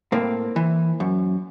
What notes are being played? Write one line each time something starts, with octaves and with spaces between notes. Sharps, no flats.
A2 A#3 C4
E3
F#2